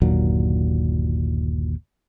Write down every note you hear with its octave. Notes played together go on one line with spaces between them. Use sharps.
G1 D#2 A#2 F#3